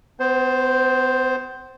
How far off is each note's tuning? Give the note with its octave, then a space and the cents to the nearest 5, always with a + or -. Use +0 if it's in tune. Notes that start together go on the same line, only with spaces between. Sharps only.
B3 +40 C5 +0